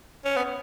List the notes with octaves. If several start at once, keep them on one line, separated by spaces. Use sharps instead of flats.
C#4
B3